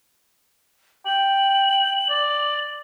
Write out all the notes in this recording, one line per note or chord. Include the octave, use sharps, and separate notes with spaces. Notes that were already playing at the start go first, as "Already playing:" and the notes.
G5 F#7
D5